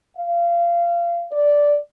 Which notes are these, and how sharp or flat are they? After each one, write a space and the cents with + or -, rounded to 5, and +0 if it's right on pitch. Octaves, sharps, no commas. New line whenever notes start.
F5 -25
D5 -5